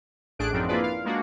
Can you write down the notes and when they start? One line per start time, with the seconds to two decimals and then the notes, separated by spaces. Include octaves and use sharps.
0.39 A1 A2 D4 G#4 F#6 D7
0.52 F#2 F3 C4 D4 D#4
0.68 A#3 E4 F4 G#4 B4 D5
0.83 F5
1.04 G#3 A#3 D4 F#4